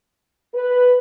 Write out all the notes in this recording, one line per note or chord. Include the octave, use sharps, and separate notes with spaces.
B4